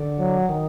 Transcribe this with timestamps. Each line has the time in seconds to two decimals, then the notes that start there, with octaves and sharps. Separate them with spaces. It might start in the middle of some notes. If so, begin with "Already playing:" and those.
Already playing: D3
0.20 F#3
0.49 D#3